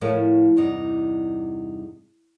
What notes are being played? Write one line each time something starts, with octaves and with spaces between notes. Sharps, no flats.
A2 F3 A3 A#4 C#5
E2 G2 C3 D#4